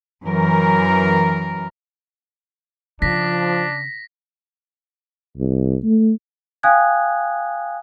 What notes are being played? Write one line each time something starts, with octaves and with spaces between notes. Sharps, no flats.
F#2 E3 A#4
C#3 F3 D4 A#6 B6
C2
A3
F5 G5 G#5 D#6 F#6 G#6